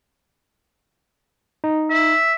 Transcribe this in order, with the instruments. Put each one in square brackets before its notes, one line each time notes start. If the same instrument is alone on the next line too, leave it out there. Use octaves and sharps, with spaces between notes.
[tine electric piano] D#4
[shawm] E5